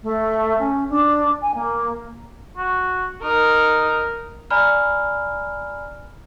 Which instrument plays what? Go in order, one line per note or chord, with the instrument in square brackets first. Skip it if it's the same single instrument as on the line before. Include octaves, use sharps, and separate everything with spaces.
[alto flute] A3
C#4
D4
G#5
A#3
[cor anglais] F#4
[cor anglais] D#4 [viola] A#4
[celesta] D5 G#5 A#5 B5 F6